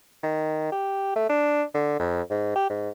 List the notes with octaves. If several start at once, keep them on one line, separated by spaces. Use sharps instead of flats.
D#3
G4
A3
D4
D3
F2
G#2
G4
G#2